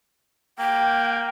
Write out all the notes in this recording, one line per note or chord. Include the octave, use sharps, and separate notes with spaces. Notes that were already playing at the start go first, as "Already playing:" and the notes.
A#3 G5